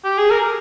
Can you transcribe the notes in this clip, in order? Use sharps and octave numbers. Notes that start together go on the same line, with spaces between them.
G4
G#4
A#4